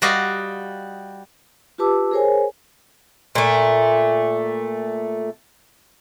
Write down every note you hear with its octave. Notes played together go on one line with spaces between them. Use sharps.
G3 F#4 G4 D#5 F5
F4 G4 B4 A5 D6 E6
G#4 A#4 C5 C#5 G#5
A#2 A3